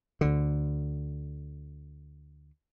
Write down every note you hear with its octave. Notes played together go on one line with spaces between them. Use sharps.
D2 D3